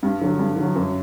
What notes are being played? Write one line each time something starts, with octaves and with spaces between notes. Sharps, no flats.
G2
D3 F#3
G2
D3 F#3
F#2